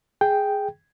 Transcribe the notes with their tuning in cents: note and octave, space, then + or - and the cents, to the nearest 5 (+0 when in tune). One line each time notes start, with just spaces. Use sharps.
G#4 +0 G5 +0